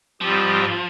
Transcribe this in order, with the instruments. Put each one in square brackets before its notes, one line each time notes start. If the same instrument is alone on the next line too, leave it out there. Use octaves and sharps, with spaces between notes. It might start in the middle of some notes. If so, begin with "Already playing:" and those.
[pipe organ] G#2 G3 C4 G4 [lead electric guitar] F3